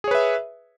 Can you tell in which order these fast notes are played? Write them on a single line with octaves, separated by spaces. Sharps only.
G#4 C#5 B4 E5